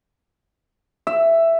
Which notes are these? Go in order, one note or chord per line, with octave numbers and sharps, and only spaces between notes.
E5